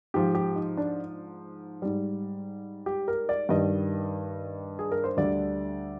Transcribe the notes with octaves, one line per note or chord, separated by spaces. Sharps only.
G#2 F3 G4
G4
D#4
D4
G#2 G3
G4
A#4
D5
G2 D#3 G3 D#5
G#4
A#4
C5
D2 D3 G3 D5